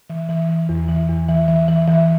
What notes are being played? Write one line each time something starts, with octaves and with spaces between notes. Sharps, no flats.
E3
E3
E3
E2
E3
E2
E3
E3
E3
E3